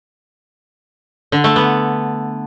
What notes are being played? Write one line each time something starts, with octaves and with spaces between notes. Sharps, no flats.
D3
A3
B3